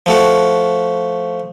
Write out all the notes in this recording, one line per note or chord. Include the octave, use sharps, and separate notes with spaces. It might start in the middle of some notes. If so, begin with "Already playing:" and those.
F3 A3 F#4